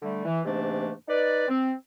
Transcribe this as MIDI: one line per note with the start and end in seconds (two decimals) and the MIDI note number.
0.02 0.23 50
0.02 0.23 55
0.02 0.23 57
0.25 0.40 52
0.45 0.91 44
0.45 0.91 48
0.45 0.91 52
0.45 0.91 57
0.45 0.91 58
0.45 0.91 62
1.08 1.45 63
1.08 1.45 71
1.08 1.45 74
1.48 1.72 60